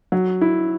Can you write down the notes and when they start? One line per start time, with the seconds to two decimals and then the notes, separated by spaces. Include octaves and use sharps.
0.12 F#3
0.41 E4